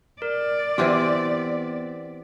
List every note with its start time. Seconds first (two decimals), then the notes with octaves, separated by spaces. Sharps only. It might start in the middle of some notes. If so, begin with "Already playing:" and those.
0.22 A#4 D5
0.78 E3 B3 C4 G4 B6